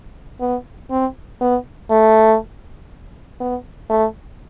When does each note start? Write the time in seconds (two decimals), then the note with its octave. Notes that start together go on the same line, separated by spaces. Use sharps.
0.40 B3
0.91 C4
1.41 B3
1.90 A3
3.40 B3
3.90 A3